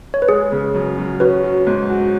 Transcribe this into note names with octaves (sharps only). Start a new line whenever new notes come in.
C#5
B4
G#3 G#4
C#3
F#2
F#2
C#4 F#4 B4
F#3
G#2
F#4